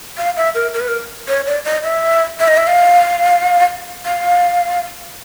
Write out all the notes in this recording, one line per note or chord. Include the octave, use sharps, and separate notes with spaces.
F5
E5
A#4
A#4
B4
A#4
C#5
D5
D#5
E5
E5
D#5
E5
F5
F5